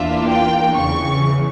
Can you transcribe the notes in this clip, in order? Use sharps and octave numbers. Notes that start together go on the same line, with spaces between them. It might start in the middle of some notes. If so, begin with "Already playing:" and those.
Already playing: E2 E3 A#3 D4 F4 E5
G5
E2 C#3 E3 C#6